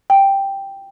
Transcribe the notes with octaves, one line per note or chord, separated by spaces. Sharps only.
G5